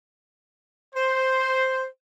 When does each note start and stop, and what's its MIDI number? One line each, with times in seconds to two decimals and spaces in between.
0.95 1.84 72